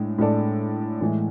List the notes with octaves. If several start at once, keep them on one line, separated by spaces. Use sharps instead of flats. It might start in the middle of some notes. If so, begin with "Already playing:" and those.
Already playing: A2 G#3 D4
A2 G#3 D4 A4 D5
A2 E3 G#3